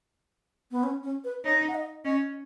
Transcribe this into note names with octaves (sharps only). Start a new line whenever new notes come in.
B3
C#4
C#4
B4
D#4 C#5
F#5
D#5
C#4 D#5